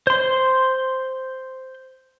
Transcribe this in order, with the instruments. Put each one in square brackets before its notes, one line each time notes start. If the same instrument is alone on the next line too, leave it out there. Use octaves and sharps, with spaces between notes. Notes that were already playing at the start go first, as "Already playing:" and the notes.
[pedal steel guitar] C5 C6